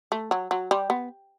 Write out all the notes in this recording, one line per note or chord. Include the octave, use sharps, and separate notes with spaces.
A3
F#3
F#3
G3
B3